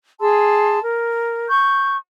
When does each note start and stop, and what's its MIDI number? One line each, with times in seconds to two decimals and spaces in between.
0.20 0.79 68
0.20 0.79 81
0.20 0.79 84
0.20 0.79 88
0.82 1.47 70
1.49 1.97 85
1.49 1.97 91